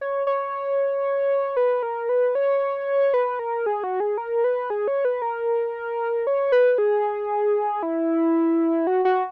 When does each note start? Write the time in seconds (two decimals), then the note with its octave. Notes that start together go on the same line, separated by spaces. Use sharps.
0.01 C#5
0.27 C#5
1.57 B4
1.83 A#4
2.09 B4
2.35 C#5
3.14 B4
3.39 A#4
3.66 G#4
3.83 F#4
4.00 G#4
4.18 A#4
4.44 B4
4.70 G#4
4.88 C#5
5.05 B4
5.22 A#4
6.27 C#5
6.52 B4
6.78 G#4
7.83 E4
8.87 F#4
9.05 F#4